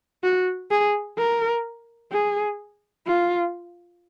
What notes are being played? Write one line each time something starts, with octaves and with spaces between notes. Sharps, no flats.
F#4
G#4
A#4
G#4
F4